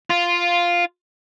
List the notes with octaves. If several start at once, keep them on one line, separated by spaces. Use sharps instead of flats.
F4